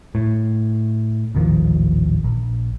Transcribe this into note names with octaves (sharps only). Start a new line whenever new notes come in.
A2
D#1 A1 D#3 F3
A#1